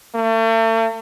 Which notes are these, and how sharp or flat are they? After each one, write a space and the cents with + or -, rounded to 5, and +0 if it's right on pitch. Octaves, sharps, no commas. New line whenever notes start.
A3 +40